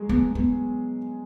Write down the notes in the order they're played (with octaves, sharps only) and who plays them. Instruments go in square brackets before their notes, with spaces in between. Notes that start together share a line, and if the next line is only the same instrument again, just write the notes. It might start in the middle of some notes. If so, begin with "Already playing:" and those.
Already playing: [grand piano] F#3 G#3 G#4
[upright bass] B3
B3